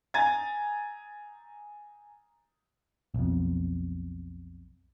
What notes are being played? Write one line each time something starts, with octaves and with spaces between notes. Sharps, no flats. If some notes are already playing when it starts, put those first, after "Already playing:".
G#5 A#5 G#6 A6
B1 F2